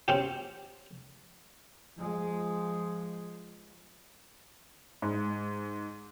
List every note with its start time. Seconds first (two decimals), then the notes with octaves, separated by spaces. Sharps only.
0.08 C4 C#4 G4
1.99 F3 G#3
5.02 G#2